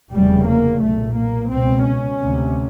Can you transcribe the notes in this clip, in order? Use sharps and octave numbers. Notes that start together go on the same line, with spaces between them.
F1 E2 C#3 G3
A#3
B1 A#2 A3
A#3
C#2 B2 C4
C#4
D2 C3